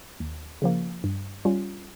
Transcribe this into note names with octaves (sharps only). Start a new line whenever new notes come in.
D#2
C#3 F3 A#3
G2
G3 C#4 F4